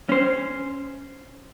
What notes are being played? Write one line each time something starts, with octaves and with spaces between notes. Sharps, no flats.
C#4 C5